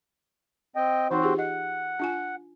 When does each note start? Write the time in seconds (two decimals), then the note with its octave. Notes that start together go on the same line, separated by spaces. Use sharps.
0.76 C4 D#5 G5
1.11 E3 C4 D#4 F#4 C5 C#5
1.22 F4 G4 G#4
1.38 D#5 F#5
1.99 D4 F4 G#5